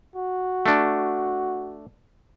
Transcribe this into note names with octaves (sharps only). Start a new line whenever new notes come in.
F#4
A3 D4